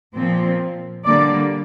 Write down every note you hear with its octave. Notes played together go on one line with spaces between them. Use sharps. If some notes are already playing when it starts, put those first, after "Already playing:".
A#2 F3 C4
D3 G3 A#3 D5